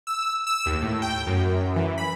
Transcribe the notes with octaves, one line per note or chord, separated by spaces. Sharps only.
E6
E6
D#2
A2
G5
F#2
E3
B5